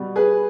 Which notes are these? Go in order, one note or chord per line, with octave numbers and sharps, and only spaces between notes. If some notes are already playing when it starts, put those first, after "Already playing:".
Already playing: B2 G3
G#4 B4